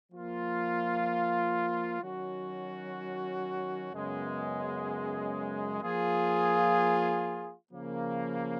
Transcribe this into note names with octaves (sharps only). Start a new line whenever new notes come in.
F3 A#3 F4
D#3 F#3 C#4 F#4
F#2 C#3 G#3 B3
F3 A#3 F4 G#4
C#3 F3 A#3